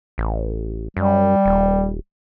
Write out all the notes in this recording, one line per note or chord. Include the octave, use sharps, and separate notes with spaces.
A1
F#2 G3
D#1